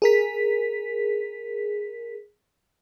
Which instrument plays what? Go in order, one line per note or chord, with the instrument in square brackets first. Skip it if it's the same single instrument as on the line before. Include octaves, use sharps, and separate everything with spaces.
[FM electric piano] G#4 A#4 B6